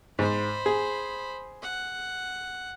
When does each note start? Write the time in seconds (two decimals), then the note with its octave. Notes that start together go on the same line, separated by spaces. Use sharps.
0.19 G#2 C5 B5
0.66 G#4
1.62 F#5